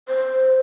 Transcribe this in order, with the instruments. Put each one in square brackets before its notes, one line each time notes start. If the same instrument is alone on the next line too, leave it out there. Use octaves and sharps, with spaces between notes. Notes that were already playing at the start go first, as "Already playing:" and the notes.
[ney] C5